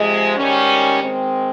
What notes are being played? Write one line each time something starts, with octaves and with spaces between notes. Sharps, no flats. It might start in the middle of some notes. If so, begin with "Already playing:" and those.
Already playing: C3 F3 G#3
G#2 D#3 G3 C#4
D#3 G#3 C4